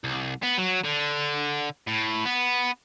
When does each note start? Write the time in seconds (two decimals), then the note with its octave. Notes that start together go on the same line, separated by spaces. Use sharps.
0.04 C2
0.43 B3
0.58 F#3
0.84 D3
1.87 A2
2.25 B3